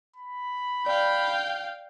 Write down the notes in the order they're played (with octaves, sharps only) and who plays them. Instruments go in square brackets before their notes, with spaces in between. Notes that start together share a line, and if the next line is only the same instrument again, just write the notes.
[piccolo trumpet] B5
[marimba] D5 [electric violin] F5 G5